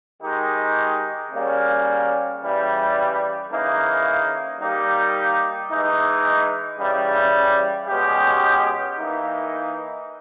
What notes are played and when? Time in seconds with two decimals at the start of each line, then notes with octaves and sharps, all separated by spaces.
0.22 D#3 G#3 D#4 G4
1.32 C#3 G3 A#3 C#4
2.41 C#3 E3 G3
3.50 C#3 E3 A#3 D#4
4.60 G3 A#3 D#4 G4
5.69 E3 G#3 D#4
6.79 C#3 E3 G3
7.88 B2 G#3 C#4 G4
8.97 E3 A#3 D#4